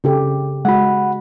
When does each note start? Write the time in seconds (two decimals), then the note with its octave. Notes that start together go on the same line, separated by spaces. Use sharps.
0.04 C#3 G4 A4
0.65 G#3 F#4 F#5 B5